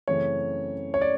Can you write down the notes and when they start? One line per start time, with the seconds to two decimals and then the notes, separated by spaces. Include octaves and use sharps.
0.08 F#2 C#3 E3 A3 C4 C#5
0.94 C#5
1.01 D5